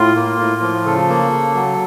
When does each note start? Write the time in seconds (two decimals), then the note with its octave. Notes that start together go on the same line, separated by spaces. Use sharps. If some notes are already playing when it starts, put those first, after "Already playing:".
Already playing: A2 F4
0.16 A#3
0.39 A2
0.62 F3
0.85 C#3 A4
1.09 A#3
1.32 C#3
1.55 F#3